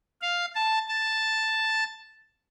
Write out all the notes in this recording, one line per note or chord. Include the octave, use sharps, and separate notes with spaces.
F5
A5
A5